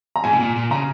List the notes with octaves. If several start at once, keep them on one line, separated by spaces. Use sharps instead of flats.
A#5
G#2 G#5
C3
A#2
A#2
C#3 A#5